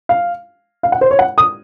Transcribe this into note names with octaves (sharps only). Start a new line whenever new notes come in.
F5
F5
F#5
C5
C#5
F#5
D#6